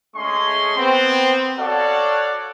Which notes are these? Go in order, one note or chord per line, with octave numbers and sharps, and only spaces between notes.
G#3 A3 C#4 G#4 C6 C#6
B3 C4
F#4 A4 C#5 D5 F5 F#5